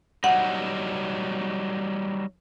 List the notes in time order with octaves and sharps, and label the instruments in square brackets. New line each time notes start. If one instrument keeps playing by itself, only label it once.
[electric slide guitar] F#3 G3 D#4 [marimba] F#5